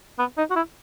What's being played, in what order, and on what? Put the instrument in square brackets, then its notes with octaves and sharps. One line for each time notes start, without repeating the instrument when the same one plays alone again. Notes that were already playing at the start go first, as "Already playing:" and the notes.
[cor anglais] B3
D#4
F#4
E4